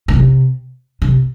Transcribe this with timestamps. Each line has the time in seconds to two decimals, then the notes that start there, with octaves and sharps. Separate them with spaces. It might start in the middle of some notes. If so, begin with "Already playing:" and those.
0.08 A#2
0.13 C3
1.02 C3